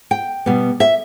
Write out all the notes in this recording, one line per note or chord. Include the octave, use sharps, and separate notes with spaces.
G5
B2 G3 B3
E5